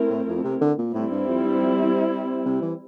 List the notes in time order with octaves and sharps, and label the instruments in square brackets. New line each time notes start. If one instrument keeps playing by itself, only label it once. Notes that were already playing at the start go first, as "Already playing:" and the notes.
Already playing: [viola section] A3 C4 E4 A#4
[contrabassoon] A2
F2
C3
D3
A#2
[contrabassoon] A2 [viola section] G3 C4 E4
[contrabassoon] G2
F2
G2
F2
E2
C3
E3